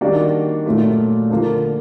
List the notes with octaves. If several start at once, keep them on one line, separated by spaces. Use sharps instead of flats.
D#3 G3 A#3 D4 F#4
A#2 F#3 A3
D3 F3 A#3